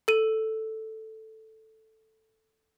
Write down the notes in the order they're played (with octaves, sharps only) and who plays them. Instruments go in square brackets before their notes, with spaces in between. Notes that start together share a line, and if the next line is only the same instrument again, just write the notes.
[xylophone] A4 D#7